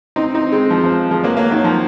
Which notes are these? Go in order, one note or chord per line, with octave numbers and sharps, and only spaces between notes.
C4 D#4
C4 D#4
G#3 C4
F3
F3
F3 G#3
F#3 A#3
F#3 A#3
D#3 F#3
F3